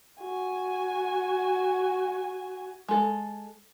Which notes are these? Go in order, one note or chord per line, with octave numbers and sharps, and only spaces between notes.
F#4 G#5
G#3 A4